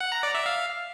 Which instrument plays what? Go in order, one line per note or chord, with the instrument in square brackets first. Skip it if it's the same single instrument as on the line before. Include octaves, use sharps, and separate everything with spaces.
[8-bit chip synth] F#5
A#5
D5
E5
F5